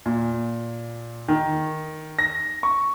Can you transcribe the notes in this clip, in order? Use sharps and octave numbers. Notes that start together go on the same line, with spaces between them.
A#2
D#3
A#6
C#6